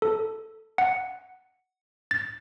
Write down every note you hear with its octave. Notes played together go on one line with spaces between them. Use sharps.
A4
F#5
A6